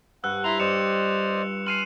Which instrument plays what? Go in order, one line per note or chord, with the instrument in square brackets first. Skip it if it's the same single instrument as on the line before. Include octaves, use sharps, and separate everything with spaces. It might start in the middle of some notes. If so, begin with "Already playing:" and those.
[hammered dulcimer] G2 [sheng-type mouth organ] F#5 [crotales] E6 F#6
[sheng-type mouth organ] E4 A#5 C6 [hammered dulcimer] F4 [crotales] F7
[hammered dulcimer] G2 [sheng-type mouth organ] C5 D5 D#5 [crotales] C#7 E7
[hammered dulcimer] G#5 C6 [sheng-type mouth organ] F6 [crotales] C7 D#7 F#7